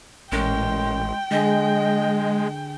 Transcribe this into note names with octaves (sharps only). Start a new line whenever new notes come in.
A1 A#2 G#3 C#4 A#4 G5
D3 G#3 G#4 D#5